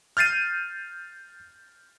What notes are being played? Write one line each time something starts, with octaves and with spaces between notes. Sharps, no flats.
F6 G6 A6 C7 D#7